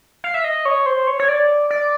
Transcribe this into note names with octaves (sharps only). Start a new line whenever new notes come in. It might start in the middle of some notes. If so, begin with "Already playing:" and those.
F5
E5
D#5
C#5
C5
C#5
C#5
D5
D5